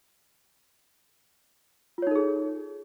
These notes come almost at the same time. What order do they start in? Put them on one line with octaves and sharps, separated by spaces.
F4 C#5 D#4 A4 G#4